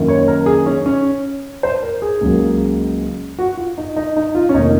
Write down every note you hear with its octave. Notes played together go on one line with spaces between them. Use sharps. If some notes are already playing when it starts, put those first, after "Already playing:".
Already playing: F#2 D#3 A#3
C#5
A#4
G#4
C#4
C#4
C5
A#4
G#4
C#2 C#3 F#3 A#3
F#4
F4
D#4
D#4
D#4
F4
C#4
F1 D#3 A#3 D#4